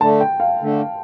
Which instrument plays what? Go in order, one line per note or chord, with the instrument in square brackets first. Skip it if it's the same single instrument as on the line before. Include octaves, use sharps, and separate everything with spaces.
[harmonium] D3 A3 D4 [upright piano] A5
[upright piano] G5
F5
[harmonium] D3 A3 D4